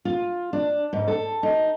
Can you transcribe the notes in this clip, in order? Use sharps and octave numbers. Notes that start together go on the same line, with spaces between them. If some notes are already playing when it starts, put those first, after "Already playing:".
F4
D4
G#2
A4
D#4